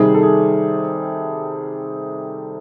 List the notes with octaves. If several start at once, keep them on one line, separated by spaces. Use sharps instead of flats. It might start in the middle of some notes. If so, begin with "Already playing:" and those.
Already playing: C3 D#3 G3 G#4
A4
G#4